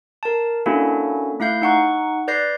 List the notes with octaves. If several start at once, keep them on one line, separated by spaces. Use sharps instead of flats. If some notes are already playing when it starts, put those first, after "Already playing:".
A#4 A5
A#3 C#4 D4 E4 F#4 A4
A3 E4 F5 G6
D#4 F#5 C#6
B4 D5 G6 A#6 C7